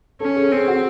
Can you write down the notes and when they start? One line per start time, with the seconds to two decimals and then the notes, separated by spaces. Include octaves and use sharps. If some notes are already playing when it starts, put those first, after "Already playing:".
0.20 C#4 A4
0.36 G#4
0.52 C4 G#4
0.68 F#4